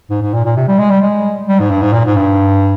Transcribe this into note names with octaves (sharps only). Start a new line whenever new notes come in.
G#2
G#2
A#2
A#2
C3
G3
G#3
G3
G#3
G3
G#2
G2
G#2
A#2
G#2
G2